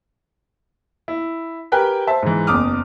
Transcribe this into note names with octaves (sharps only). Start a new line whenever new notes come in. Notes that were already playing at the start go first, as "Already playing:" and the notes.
E4
G4 A#4 B4 G5 G#5 F#6
C5 E5 A5
G#2 E3
F#1 E2 D6 D#6 F6